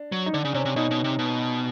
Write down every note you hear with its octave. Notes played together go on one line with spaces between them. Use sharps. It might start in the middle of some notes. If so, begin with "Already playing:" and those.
Already playing: D4
F#3
D#4
D3 D4
C#3
C3 C#4
C3
B2 D#4
B2
C3
B2